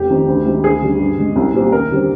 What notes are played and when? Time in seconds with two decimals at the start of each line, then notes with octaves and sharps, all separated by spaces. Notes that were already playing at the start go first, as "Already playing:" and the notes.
Already playing: F1 G4
0.10 F2 D#3
0.28 D2
0.45 C3 D#3 G#3
0.63 D2 G#4
0.82 D3 G3
0.99 G2
1.18 D3 G#3
1.36 C2
1.54 A#2 G3 C4
1.72 D#2 A#4
1.91 D3 G3 C4